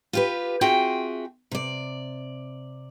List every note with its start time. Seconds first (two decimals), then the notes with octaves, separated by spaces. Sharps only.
0.13 F4 G4 B4
0.61 C4 F4 F#4 G#4 E5 G5
1.51 C3 D5